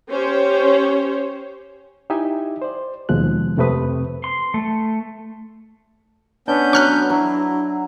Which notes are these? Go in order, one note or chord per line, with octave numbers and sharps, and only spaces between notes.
C#4 G4 C5 C#5
D#4 E4 G4 D#5 E5 G#5
C5 D5
D#2 B2 F3 G#3 F#6
F2 C3 A3 C4 B4 D#6
C6
A3
B3 C#4 D4 G6
F#3 C#6 F6 F#6
F#3 E4